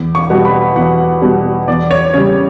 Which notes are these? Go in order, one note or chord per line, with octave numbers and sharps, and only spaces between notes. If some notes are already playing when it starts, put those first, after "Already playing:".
Already playing: E2
C#6
B2 G3 B3
B5
E2 F#5
B2 G3 B3
E2 D5
C#5
C#3 G3 C#5